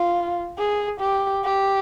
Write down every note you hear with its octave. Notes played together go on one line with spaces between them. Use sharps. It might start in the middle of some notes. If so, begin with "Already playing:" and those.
Already playing: F4
G#4
G4
G4